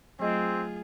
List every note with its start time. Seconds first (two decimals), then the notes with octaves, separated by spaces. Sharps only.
0.20 F#3 A3 C4 F4 G#4 D#5